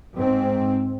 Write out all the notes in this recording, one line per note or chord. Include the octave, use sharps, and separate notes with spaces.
G#2 C4